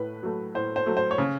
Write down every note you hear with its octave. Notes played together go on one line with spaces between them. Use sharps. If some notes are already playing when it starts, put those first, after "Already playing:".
Already playing: A2 A3 B4
F#3 A3
A2 C5
C5
F#3 A3
C5
C#5
C#3